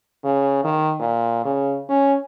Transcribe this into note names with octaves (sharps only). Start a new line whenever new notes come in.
C#3
D#3
A#2
C#3
C#4